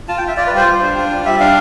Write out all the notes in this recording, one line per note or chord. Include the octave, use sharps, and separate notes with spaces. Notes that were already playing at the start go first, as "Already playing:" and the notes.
F4 A5
G5
F4
E5
F4 D5
B4
G3 C5
G3
D4
F4
G3
G3 E5
D4 F5